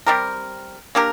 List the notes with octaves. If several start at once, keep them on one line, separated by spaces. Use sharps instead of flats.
G3 C4 G4 A#4
A#3 D4 G4 A#4